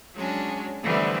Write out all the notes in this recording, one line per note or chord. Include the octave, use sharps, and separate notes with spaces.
F#3 G#3 C#4 D4
D3 E3 G3 A3 B3 C4